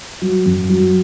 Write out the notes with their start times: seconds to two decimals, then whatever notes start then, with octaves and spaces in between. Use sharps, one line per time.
0.22 F#3
0.46 F#2
0.69 F#3